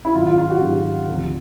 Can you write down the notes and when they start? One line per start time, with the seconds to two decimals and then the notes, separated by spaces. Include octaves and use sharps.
0.05 E4
0.15 G#2 D#3 F#3 F4
0.27 F4
0.38 F4
0.50 F#4
0.61 G#2 D#3 F#3 G4
1.08 D2 C3 F3